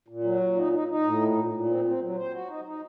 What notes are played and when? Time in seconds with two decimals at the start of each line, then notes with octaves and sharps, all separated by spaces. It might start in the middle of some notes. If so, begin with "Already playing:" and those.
0.08 A#2
0.24 F#3
0.41 A#2
0.57 D#4
0.73 D#4
0.88 D#4
1.04 A2
1.21 A#2
1.37 A#2
1.52 A#2
1.68 C4
1.85 C4
2.01 F#3
2.17 C5
2.33 F#4
2.49 D#4
2.65 D#4